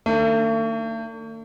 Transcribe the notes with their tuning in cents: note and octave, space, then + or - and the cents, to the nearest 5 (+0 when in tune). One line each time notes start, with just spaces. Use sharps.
D#3 -10 A3 +45 D4 +0